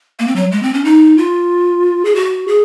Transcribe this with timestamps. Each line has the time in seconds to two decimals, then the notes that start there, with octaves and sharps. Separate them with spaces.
0.19 A#3
0.27 C4
0.36 F#3
0.52 G#3
0.63 C4
0.74 C#4
0.85 D#4
1.18 F4
2.05 G#4
2.15 F#4
2.48 G#4